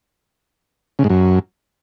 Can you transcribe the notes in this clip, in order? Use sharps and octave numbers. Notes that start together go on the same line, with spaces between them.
C#3
G#2
F#2